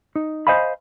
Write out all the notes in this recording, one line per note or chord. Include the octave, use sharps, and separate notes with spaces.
D#4
C5 D#5 F5 G#5 B5